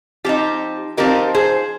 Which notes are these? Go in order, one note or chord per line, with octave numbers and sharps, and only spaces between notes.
F3 C4 D#4 G4
F3 C4 D#4 G4 A#4
G#4 C5